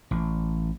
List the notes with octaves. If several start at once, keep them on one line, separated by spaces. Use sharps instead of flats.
A1